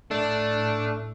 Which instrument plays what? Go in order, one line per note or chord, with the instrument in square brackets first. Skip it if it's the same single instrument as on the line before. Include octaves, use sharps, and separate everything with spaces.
[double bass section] A2 [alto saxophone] A3 [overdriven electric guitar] D4